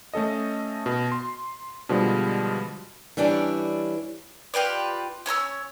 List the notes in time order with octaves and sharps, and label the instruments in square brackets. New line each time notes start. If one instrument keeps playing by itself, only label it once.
[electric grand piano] A3 C#4 A4 D#5
B2
C6
B2 D3 F3 G3 G#3
[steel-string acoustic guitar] E3 G3 C#4 D4 E4
[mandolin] F4 G4 B4 D5
C#4 C#5 A#5 E6